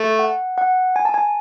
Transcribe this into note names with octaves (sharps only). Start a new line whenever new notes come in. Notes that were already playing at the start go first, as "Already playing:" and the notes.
Already playing: A3
F#5
F#5
G#5
A5
G#5